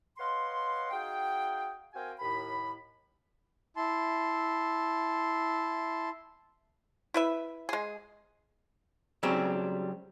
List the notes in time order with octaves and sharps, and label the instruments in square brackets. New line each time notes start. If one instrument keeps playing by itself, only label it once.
[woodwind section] B4 C#5 D#5 F5 F#5 C6
D#4 F#4 G#4 F5 G5
C4 F#4 A#4 F5 G5 G#5
D#2 A2 B5
[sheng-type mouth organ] E4 A5 C6
[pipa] E4 B4 E5
G#3 G#4
[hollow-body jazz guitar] C#3 F#3 G3 C4